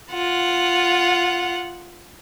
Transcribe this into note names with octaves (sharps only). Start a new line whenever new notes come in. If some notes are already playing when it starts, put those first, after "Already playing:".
F4 F#5